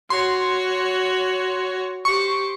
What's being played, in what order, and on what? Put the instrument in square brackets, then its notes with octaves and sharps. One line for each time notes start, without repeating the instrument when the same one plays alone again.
[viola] F#4 C#5 [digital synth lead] C6
[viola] G4 C5 [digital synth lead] C#6